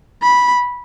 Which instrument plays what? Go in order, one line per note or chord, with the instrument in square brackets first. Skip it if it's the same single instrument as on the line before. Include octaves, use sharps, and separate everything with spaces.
[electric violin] B5